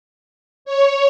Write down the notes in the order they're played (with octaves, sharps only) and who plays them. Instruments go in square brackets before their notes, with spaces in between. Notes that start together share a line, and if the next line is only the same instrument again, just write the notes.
[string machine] C#5